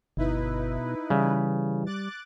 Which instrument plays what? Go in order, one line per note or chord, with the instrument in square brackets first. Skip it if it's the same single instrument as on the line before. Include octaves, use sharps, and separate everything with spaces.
[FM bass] G1 [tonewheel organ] B2 [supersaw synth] D#4 E4 B4
[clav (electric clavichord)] C#3 [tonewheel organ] E3 [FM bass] G3
[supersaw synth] D6 F#6 A6